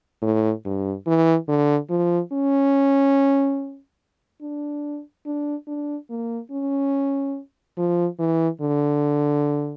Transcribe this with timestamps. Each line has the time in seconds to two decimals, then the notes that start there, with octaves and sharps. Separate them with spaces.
0.22 A2
0.65 G2
1.07 E3
1.48 D3
1.90 F3
2.32 C#4
4.42 D4
5.26 D4
5.67 D4
6.10 A#3
6.51 C#4
7.77 F3
8.19 E3
8.61 D3